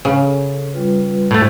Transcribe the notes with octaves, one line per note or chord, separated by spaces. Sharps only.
C#3 F5
C#4 A4
G3 F4 B4
A2 A3 C5